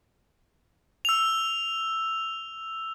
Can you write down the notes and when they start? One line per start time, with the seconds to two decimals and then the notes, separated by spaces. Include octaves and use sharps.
1.05 E6 F7